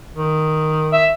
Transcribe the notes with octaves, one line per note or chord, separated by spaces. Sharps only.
D#3
E5